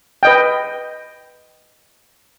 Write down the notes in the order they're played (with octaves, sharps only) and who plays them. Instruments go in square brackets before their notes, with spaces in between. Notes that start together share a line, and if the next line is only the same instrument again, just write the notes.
[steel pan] B4 D#5 G5